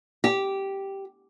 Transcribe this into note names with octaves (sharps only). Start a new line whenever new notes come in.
G4